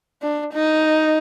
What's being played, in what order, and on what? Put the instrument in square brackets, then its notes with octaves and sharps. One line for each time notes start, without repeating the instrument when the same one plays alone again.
[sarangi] D4
D#4